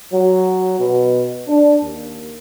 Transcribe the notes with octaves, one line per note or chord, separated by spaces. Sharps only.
F#3
B2
D4
D#2